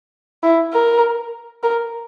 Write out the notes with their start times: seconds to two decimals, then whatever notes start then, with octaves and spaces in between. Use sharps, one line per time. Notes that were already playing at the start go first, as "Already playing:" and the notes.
0.43 E4
0.73 A#4
1.63 A#4